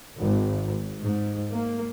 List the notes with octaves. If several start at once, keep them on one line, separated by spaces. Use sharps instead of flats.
G#1
G#2
A#3